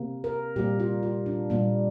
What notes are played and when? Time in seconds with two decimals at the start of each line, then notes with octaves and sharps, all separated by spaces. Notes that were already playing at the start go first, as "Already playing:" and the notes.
Already playing: C3 A#3
0.24 A#4
0.56 A#2 G3 A#3 G4
0.80 F4
1.03 F4
1.26 D4
1.50 A#2 G3 A#3